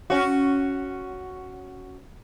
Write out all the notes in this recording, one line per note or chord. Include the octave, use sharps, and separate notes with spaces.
C#4 F#4